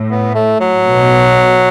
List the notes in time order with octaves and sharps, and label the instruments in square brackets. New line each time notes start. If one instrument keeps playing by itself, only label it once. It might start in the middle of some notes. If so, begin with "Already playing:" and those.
Already playing: [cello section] A2
[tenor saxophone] B3
A3
F#3
[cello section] B2